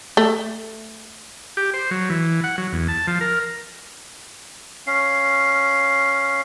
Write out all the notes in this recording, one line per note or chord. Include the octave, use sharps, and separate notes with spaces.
A3
G4
C5
F#3
E3
F#5
F#3
E2
A5
F3
A#4
C#4 F5